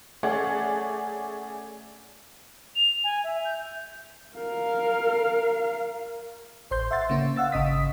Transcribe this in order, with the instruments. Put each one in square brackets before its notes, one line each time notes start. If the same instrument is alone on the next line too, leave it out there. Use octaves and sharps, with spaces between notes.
[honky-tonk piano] A3 C#4 G#4 C#5 D5 F#5
[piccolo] F7
G#5
E5
G6
[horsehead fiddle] A#4 F5
[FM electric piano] A1 C5 C6 G6
E5 F#5 C6 A6
C#3 A#3 C#4
F5 F#5 E6 A6
G#1 C#3 D#5 D#6 B6